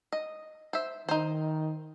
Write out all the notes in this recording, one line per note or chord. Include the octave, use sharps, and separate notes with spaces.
D#5
C5 E5
D#3 D#4 C5